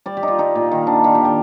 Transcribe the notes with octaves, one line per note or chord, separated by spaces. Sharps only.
G3 D5
G4
D#4
F4
G3 D#4
A#2
D#3
D4
D#3 F4
G4
G4